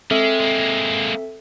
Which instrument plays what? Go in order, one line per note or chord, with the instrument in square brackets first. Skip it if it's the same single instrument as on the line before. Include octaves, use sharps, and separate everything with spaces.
[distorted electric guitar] G#3 [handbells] C4 A4 E5
[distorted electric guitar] G#3 A#3